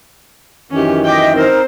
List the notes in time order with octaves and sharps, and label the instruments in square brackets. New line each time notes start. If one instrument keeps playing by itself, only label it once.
[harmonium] F#2 D#3 E3 [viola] C#4 G4
[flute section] D#5 E5 [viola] G5 D6
[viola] C4 C5 [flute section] D#4 A#4